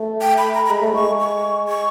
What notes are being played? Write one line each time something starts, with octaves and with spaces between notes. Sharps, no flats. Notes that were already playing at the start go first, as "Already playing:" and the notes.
Already playing: A3
G5
B5
A#5
A#5
G#3 B5
A3
G#3 C#6
C#6
C#6